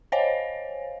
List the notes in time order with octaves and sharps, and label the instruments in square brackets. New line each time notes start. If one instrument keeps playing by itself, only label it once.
[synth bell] C5 C#5 D#5 F5 G#5